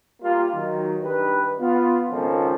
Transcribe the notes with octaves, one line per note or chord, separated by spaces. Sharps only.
G3 A#3 F4
D#3 F#3
G2 D#3 G3 B4
B3 F4
G#1 C#2 D#3 F3 C#4 A4